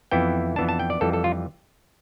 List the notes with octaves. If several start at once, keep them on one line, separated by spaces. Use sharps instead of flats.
F2 E3 B3 E4 G5
F2 E3 B3 D4 A5
A5
G5
D5
F2 E3 G3 A4
A4
F4